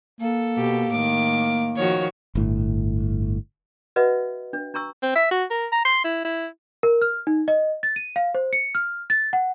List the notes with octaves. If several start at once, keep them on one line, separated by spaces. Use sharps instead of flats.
A#3 A4
B2 G4
A2 D#3 D6
D#3 F3 F#4 C#5
G1 A2
F#4 B4 D#5 E5 F#5
D4
D4 A#5 C#6 E6
C4
E5
F#4
A#4
A#5
C6
E4
E4
A#4
F6
D#4
D#5
A6
D#7
F5
C5
C#7
F6
A6
F#5